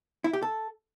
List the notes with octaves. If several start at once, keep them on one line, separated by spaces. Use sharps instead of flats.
E4
G4
A4